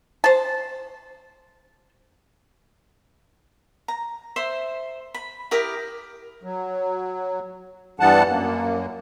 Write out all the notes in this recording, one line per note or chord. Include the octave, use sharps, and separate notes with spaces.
C5 A5
A#5
C5 E5 C6
B5
E4 G4 A#4 D#6
F#3
G2 E3 G3 B3 F#5 A5
F#2 A#3